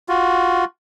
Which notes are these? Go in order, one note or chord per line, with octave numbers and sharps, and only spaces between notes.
F4 F#4